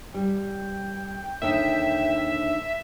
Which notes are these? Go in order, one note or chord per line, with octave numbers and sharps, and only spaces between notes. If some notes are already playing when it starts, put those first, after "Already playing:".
G3 G5
D#2 D3 D#4 E5